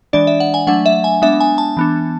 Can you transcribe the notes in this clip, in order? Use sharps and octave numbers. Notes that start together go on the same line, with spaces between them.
E3 G#3 D4 D5
E5
F#5
G#5
F#3 A3 D4 F#5
E5
G#5
G#3 B3 D4 E5
G#5
A5
E3 B3 D4